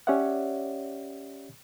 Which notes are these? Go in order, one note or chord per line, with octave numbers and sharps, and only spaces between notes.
C#4 G4 C#5 D5 E5 F#5